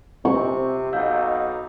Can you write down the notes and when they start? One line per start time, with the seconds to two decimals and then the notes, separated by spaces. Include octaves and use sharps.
0.25 C3 C4 C#6
0.93 B1 D#4 F5 E6 G6